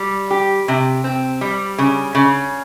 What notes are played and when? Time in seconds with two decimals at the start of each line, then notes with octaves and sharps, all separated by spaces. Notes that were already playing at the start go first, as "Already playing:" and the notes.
Already playing: G3
0.30 G4
0.68 C3
1.04 C4
1.41 G3
1.78 C#3
2.15 C#3